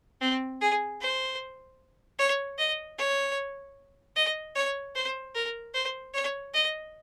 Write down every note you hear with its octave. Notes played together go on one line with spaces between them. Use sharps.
C4
G#4
C5
C#5
D#5
C#5
D#5
C#5
C5
A#4
C5
C#5
D#5